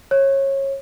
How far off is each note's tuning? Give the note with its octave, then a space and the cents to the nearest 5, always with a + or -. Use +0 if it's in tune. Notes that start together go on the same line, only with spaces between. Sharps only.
C#5 -25